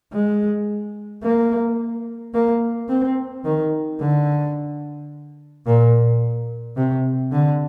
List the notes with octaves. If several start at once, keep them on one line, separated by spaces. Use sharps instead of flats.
G#3
A#3
A#3
C4
D#3
D3
A#2
C3
D3